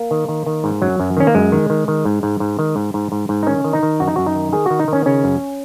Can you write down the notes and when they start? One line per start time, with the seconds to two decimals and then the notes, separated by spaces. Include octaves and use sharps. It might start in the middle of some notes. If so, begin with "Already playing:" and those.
Already playing: A#3
0.11 D#3
0.29 D#3
0.46 D#3
0.64 G#2
0.82 F#2 F#3
1.00 F#2
1.17 D#3 C#4
1.27 A#3
1.35 F#2 G#3
1.52 D#3
1.70 D#3
1.88 D#3
2.05 G#2
2.23 G#2
2.40 G#2
2.59 D#3
2.76 G#2
2.94 G#2
3.12 G#2
3.29 G#2
3.43 D#4
3.46 D#3 C#4
3.64 D#3
3.73 D#4
3.83 D#3
4.00 F#2 F#4
4.08 D#4
4.16 F#2 F#4
4.26 D#4
4.35 D#3
4.53 D#3 G#4
4.66 D#3 F#4
4.79 D#4
4.88 D#3 C#4
5.06 C#3 C#4
5.24 F#2